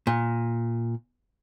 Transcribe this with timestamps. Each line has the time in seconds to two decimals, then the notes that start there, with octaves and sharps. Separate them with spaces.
0.07 A#2